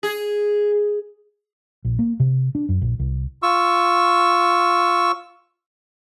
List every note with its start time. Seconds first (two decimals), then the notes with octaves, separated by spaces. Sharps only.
0.03 G#4
1.85 A#1
1.99 A#3
2.20 C3
2.55 D4
2.69 F#2
2.82 A#1
2.99 C2
3.43 F4 C#6 E6